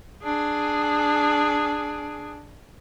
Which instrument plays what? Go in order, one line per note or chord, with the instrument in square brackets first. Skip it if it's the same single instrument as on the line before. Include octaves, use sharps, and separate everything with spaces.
[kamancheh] D4 G#4